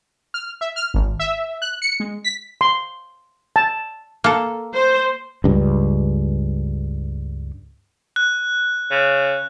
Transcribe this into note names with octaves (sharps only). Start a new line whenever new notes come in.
F6
E5
F6
G#1
E5
F#6
C#7
G#3
B6
C6
A5
A#3 A4
C5
C#2 G2
F#6
C#3